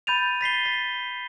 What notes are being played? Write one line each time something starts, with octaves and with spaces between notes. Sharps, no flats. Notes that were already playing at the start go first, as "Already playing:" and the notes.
B5 G6 A6 D#7 F7
A6 B6 C7 G7
A6